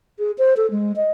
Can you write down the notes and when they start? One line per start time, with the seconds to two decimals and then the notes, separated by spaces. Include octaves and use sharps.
0.19 G#4
0.38 C5
0.57 A4
0.71 G#3
0.96 D#5